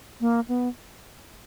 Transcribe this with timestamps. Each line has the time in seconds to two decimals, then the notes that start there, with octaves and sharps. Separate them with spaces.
0.21 A#3
0.48 B3